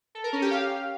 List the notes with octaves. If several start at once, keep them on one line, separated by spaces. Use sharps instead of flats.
A4
A#4
C#4
G4
F5